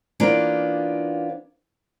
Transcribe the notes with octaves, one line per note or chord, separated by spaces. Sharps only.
E3 A#3 B3 C#4 D4 F4